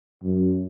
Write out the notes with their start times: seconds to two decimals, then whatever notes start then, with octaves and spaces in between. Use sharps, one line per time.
0.24 F#2